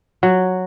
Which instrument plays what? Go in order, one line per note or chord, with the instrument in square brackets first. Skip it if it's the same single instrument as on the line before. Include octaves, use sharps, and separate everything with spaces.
[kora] F#3